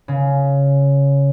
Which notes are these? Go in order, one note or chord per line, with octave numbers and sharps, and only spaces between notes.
C#3